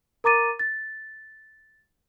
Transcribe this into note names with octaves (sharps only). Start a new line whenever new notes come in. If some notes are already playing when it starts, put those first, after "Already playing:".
A#4 A#5 D6 A6 D#7
A6